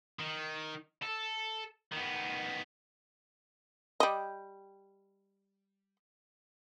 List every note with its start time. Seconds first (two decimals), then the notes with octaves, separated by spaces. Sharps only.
0.19 D#3
1.03 A4
1.92 D#3 B3
4.00 G3 D#5